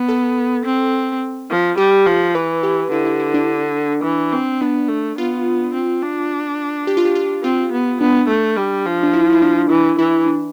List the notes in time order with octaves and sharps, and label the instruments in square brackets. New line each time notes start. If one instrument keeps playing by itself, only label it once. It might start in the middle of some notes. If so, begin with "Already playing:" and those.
Already playing: [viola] B3
[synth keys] A4
[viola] C4
F3
[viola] G3 [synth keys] G4
[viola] F3
[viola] E3 [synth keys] B4
[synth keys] G4
[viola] D3 [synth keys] E4
[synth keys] E4
E4
D4
[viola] E3
C4
[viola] B3 [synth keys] D4
[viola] A3
[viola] B3 [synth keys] F4
[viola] C4
D4
[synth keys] G4
F4
G4
F4
[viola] C4 [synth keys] F4
[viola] B3
[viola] B3 [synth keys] D4
[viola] A3
G3
F3
[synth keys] D4
E4
E4
D4
[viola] E3 [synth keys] E4
[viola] E3 [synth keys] E4
[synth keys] D4